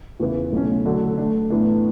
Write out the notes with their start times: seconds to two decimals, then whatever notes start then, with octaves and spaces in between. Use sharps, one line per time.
0.20 E2 C#3 E3
0.52 B1 B2 A3 C#4
0.85 D3 F#3 A3 D4 A4
1.18 D3 A3 D4
1.50 A2 E3 B3 D4